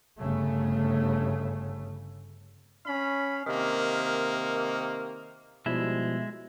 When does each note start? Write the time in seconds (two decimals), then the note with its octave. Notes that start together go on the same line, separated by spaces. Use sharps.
0.18 G1 C#3 A3
2.84 C#4 F5 B5
3.45 C3 D#3 A#3
5.66 B2 F3 G3 G#3 E4 E5